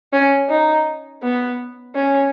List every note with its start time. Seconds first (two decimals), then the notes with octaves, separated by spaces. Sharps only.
0.13 C#4
0.50 D#4
1.23 B3
1.96 C#4